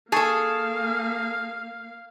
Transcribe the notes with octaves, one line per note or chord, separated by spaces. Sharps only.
A#3 G#4 A4 F5 G#5 A5 C#6